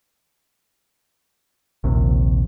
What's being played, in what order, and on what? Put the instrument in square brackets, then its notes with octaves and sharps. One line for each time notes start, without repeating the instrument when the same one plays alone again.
[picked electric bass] A#1 D#2 C3